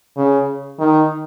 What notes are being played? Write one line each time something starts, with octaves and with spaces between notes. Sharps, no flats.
C#3
D#3